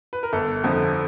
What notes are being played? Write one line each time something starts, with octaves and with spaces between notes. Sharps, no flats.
B4
A#4
G1 A4
F2 D3 F3